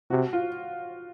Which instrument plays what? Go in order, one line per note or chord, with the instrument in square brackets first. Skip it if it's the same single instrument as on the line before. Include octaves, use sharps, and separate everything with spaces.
[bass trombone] C3 [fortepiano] F#4
[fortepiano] F4